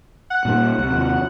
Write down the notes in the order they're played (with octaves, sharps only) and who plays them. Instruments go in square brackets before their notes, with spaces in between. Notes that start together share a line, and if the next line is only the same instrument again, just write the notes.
[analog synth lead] F#5
[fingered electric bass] A#2 G3 A#3
C2
D#2 C3